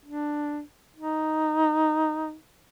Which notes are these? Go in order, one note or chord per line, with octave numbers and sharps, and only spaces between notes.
D4
D#4